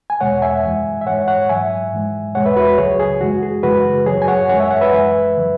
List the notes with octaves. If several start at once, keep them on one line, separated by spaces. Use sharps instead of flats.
G#5
E2 B2 G#3 C#5 F#5
E5 G#5
F#2 E3 G#3
E5
G#2 E3 G#3 C#5 F#5
C#5 F#5
G#2 F#3 E5 G#5
G#2 E3 G#3
E2 B2 G#3 C#5 F#5
B4 E5
F#4 B4
C#2 C#3 F#3 G#4 C#5
G#4
F#2 E3 G#3 F#4
G#4
F#2 C#3 E3 G#3 F#4 B4
F#2 F#3 G#4 C#5
G#5
C#5 F#5
F#2 E3 G#3 C#5 F#5
E5 G#5
C#5 F#5
B4 E5
F#2 E3 G#3
C#3 F#3